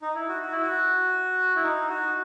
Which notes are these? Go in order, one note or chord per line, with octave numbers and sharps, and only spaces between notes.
D#4
E4
F#4
F#4
E4
F#4
E4
D#4
F#4